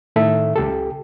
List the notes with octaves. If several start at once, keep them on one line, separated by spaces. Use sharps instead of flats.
A2 D#3 A4 E5
C#2 G4 A4